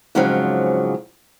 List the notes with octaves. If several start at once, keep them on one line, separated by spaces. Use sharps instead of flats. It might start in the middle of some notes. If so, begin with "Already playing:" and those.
F2 G#2 C#3 F3 F#3